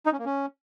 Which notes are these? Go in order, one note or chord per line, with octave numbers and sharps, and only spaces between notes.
D#4
C#4
A#3
C#4